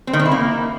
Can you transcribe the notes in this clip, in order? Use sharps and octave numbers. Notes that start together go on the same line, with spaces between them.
C4
D#3
C4
E4
A#3